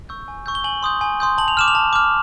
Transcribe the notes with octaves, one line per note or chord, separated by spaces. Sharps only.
C#6 E6 G6
G#5
C#6 E6 G6
G7
G#5 F#7
C6 D#6 G6
G#5
C6 D#6 G6
A5 F#7
F7
D6 F6 E7
F7
A5
D6 F6